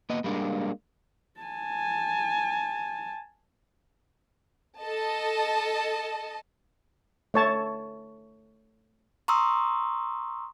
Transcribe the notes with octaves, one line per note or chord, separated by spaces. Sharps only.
A#3 B3 D#5
G3 G#3 A#3 D4
G#5 A5
A4 D#5 A5
A3 C#5 A5
A#5 C6 C#6 D#6 E6